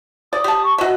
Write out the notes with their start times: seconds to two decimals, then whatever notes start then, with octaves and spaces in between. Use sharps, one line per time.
0.33 D5 D#6
0.44 G4 A5
0.63 C#6
0.78 F#4 D#5 E5